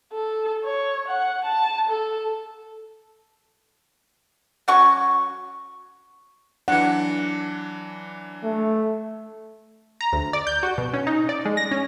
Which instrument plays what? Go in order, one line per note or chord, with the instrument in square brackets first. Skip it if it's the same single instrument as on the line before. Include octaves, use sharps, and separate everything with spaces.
[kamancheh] A4
C#5
F#5
A5
A4
[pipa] F#3 C#4 F#4 C#6
[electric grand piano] E3 F#3 D4 [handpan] F#5
[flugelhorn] A3
[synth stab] A#5
D2
D5
G6
F#4
B2
C#4
D#4
D5
G#3
A#6
C#4